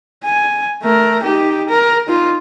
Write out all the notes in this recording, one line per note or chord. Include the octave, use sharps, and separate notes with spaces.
G#5
A3 A#4
D#4 G4
A#4
D#4 F4